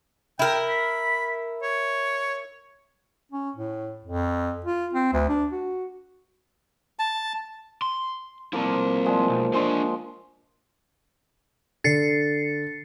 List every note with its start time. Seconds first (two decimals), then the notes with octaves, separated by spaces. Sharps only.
0.39 E4 A#4 G5
0.69 B5
1.62 C#5
3.32 C#4
3.56 A2
4.04 F2
4.64 F4
4.93 C4
5.13 D2
5.29 D4
5.52 F#4
6.99 A5
7.82 C6
8.53 F3 A#3 C4 E4
9.06 F3 G#3
9.29 B1
9.54 G#3 D4 C5 C6
11.84 D3 A6 C7 C#7